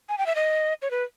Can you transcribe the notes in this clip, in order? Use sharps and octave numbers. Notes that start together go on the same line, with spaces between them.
G#5
G5
E5
D#5
C#5
B4